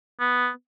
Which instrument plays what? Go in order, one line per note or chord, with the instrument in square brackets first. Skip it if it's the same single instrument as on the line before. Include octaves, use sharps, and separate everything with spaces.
[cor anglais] B3